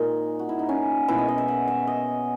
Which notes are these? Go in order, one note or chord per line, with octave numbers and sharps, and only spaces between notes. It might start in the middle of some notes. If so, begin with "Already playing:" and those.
Already playing: A#2 G#3 D#4
F#4
E4
D#4
C#4
B2 G#3 E4
D#5
D#5
E5
F#5
E5
D#5